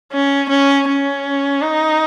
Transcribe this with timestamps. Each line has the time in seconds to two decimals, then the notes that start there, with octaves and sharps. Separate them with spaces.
0.13 C#4
0.50 C#4
0.88 C#4
1.62 D#4